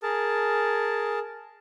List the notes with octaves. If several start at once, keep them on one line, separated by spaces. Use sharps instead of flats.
G#4 A#4 A5